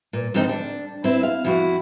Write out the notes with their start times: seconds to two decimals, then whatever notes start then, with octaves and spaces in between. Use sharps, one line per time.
0.13 A#2
0.34 F2 G#2 D3 C4 D#4
0.49 D4
1.04 C4 E4
1.23 F5
1.44 F2 E4 F#4